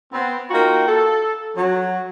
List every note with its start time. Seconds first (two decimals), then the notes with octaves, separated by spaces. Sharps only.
0.13 B3 C4
0.51 A#3 D#4 F4 F#4 G5 A#5
0.88 A4
1.57 F#3